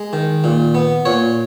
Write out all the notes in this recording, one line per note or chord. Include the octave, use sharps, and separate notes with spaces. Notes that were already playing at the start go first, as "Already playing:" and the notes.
Already playing: G#3
D#3
A#2
B3
A#2 C#5